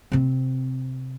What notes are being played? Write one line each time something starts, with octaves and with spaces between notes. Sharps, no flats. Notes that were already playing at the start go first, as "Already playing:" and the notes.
C3 C4